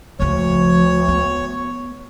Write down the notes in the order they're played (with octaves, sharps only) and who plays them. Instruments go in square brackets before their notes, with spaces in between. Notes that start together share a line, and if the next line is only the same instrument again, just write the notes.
[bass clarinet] D2 [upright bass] C#3 F3 [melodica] C#5
[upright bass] B3